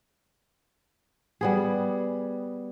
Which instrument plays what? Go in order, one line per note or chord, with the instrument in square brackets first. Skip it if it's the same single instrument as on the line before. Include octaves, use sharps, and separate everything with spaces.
[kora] G3 B3 G#4